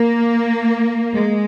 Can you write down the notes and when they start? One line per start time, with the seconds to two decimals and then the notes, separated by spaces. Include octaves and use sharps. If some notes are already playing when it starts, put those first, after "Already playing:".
Already playing: A#3
1.13 G#3